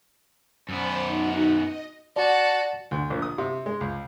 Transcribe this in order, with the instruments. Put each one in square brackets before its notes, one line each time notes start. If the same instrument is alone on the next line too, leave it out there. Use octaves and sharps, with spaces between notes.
[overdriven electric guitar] F#2 B3 [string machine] C5 D5 A5
[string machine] D#4 F#4
D#5
[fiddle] F#4 [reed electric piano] D5 [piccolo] A5
[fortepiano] D2
A#1
D#6
C3
G#3
C#2